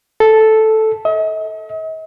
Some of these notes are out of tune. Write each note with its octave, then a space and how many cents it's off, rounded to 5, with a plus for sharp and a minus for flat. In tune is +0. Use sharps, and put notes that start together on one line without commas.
A4 -5
D#5 +45